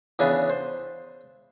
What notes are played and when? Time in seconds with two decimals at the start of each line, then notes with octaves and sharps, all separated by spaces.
0.19 E2 C#3 D4 G#4 G#5 B5
0.50 C5